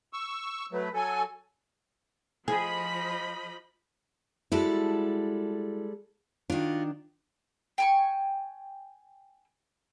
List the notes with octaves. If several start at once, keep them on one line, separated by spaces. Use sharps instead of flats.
C#6 E6
F#3 A3 B4
F#3 A4 G#5
F3 G#4 D#5 B5
G3 G#3 E4 F#4 A4
D#3 D4 F4 F#4
G5 G#5 C#6